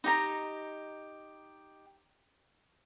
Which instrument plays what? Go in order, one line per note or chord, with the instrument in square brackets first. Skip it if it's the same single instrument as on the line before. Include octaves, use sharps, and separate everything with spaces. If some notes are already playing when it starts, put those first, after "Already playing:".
[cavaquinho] D#4 G4 A#5